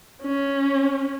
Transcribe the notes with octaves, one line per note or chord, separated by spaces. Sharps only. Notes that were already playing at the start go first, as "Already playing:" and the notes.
C#4